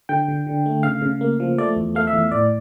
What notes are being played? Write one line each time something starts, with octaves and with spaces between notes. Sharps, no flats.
D3 G5
D3
D3
A3
C#3 F5
C#3
A#3
F3
A3 D5
E2
A3 F5
E5
E2
A2 D5